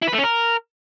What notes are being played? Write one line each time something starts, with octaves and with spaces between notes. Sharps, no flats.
E4
B4
A3
C#4
A#4